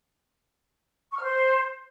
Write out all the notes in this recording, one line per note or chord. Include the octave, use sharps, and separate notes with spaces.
C#6
F6
C5